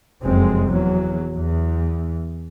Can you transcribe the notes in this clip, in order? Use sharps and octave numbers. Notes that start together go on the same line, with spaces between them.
F1 F#2 C3 G#3 C4
E2 F#3
E2